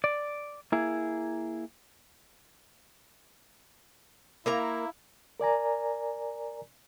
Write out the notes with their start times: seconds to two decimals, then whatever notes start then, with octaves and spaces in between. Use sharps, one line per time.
0.04 D5
0.72 A#3 E4 G#4
4.46 A#3 E4 A#4 A#5
5.40 A#4 D5 G#5 A#5